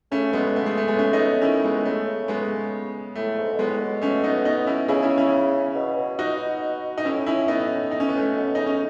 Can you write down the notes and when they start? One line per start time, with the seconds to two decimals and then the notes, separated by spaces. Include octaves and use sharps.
0.12 C#3 A3 C#4
0.33 B2 G#3 B3
0.56 C#3 A3
0.66 G#3
0.77 A3
0.88 G#3 B3
0.98 A3 C#4
1.13 B3 D#4
1.42 D#3 C#4 E4
1.64 C#3 G#3 B3
1.85 C#3 A3
2.08 C#3
2.28 G#3 B3
3.15 A2 A3
3.38 G#2
3.53 B2
3.59 A2 G#3 B3
3.80 B2
4.01 A3 C#4
4.24 B3 D#4
4.45 B3 D#4
4.66 C#4 E4
4.88 C#3 E4 G#4
5.03 C#4 E4
5.18 C#4 E4
5.75 B2
5.97 B2
6.19 D#4 F#4
6.98 D#4
7.05 A2 C#4 E4
7.26 A2 C#4 E4
7.48 B3 D#4
7.91 D#4
8.00 C#4
8.09 B3
8.17 A3 C#4
8.36 B2
8.55 C#3 D#4
8.66 C#4